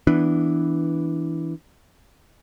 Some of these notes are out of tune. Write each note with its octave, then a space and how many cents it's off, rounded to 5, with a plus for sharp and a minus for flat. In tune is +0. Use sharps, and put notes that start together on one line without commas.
E3 -5 B3 +0 D4 -5